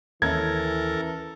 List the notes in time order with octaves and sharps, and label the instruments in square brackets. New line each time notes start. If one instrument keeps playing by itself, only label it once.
[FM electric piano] D#2 C#4 E5 [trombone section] E3 [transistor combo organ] A4 A#4 [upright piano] G#6